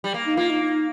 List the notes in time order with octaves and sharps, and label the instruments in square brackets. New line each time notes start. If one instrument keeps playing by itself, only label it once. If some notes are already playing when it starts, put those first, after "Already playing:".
[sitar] G3
A#3
[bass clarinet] D#4
[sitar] A#3 [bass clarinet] F4
[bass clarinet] D#4
D#4